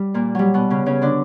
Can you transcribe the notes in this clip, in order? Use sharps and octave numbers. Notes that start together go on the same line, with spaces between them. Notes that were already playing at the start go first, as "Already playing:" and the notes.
Already playing: G3
A#2 A#3
F#3 G3
B2 B3
C#3 C#4
C#3 C#4
D3 D4